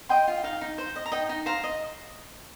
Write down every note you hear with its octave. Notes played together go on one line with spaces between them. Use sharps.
D#5 G5 C6
F4
G5
D#4 F5
D#4
C5
D#5
A#5
D#4 D#5 G5
D#4
C5 F5 A#5
D#5